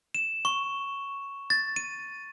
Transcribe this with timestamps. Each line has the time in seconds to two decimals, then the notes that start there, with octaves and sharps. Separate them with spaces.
0.15 E7
0.45 C#6
1.50 A6
1.76 D#7